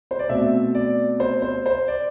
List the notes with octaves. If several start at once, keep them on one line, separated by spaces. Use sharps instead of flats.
C5
D5
B2 A3 C4 E5
D5
C5
C5
C5
D5